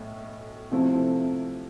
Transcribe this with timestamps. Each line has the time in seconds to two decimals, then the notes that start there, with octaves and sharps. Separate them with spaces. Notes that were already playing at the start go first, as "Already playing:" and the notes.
Already playing: B1 A2
0.71 C3 F3 A3 C4 E4